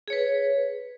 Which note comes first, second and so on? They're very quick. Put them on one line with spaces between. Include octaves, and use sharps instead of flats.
G#4 C#5 B4